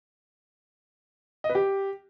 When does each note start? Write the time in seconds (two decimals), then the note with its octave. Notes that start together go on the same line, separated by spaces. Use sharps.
1.44 D#5
1.50 B4
1.55 G4